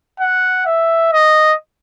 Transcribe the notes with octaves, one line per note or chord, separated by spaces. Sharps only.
F#5
E5
D#5